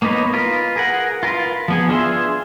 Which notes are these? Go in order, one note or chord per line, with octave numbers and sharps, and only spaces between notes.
A#3 B3 D#4 B4 C#5
F4 A#4 B4
G#4 A#4 F#5
F4 A#4 B4
F3 B3 G#4
D4 F4 G#4 E5 C6